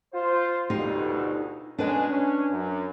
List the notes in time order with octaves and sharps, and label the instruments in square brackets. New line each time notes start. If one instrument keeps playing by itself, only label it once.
[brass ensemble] F4 C5
[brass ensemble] D2 B2 [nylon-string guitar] D#4 F4 G4
[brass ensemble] B2 G#3 C#4 [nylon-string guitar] D4 B4 G#5
[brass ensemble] C#4
F#2